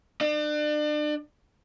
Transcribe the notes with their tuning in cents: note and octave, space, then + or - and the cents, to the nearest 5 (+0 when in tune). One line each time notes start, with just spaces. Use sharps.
D4 +35 D5 +35